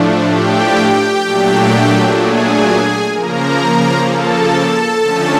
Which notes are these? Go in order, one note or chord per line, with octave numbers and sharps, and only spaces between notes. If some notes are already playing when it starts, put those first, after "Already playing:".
Already playing: A2 F3 A3 D4
G4 G5
A#2 F#3 A3 D4
G#4 G#5
C#3 F3 A#3 A#4 A#5
A4 A5
D3 F3 A3 C#4